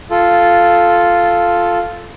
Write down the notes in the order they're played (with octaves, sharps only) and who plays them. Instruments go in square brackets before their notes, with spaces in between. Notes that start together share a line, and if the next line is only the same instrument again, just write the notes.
[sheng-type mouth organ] F4 A4